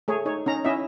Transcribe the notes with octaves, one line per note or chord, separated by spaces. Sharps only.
A3 G#4 C#5
D#4 C#5
C#4 D#4 A#5
C#4 E4 D#5 E5